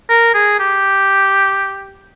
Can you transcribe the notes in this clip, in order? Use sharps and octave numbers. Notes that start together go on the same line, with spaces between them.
A#4
G#4
G4